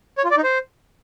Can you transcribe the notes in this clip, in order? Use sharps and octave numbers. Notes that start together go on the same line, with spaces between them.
C#5
F4
D5
D#4
C5